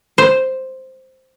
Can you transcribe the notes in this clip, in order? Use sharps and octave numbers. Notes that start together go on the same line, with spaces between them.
C5